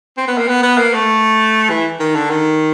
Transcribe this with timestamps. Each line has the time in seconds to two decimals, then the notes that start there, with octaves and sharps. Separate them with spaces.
0.17 C4
0.28 B3
0.38 A#3
0.48 B3
0.63 B3
0.78 A#3
0.94 A3
1.70 E3
2.00 D#3
2.16 D3
2.30 D#3